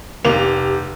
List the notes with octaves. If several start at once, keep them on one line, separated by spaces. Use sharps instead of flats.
F1 A#3 G4 F7